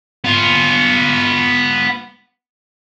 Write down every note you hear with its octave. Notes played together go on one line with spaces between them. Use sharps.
B3 F4